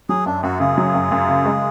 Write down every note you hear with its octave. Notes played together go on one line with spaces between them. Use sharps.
F#3 G#4
F#2 D4
F#2 F#4
C#3 G#4
F#3
F#2
F#2
C#3
G#3